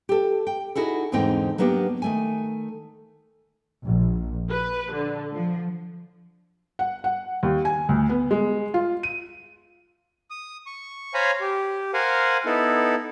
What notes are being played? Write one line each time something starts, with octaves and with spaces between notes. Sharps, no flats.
G4 A4
G5
D#4 E4 F#4 G#4 A4
E2 G#2 D3 C4 D#4 G5
F#3 A#3 B3 D4 G4
D#3 A3 G#5
A#1
B4
D3
F3
F#5
F#5
D#2
G#5
D2
B3
G#3
F4
D#7
D#6
C#6
C5 C#5 F5 G#5 A#5 B5
G4
A#4 C5 F5 F#5 G#5
B3 D#4 E4 A4